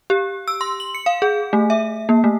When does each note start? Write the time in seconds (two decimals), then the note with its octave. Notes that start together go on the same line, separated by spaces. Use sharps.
0.10 G4
0.48 E6
0.61 C6
0.80 F#7
0.95 C#7
1.06 F5
1.22 G#4
1.53 A3
1.70 E5
2.09 A#3
2.24 A3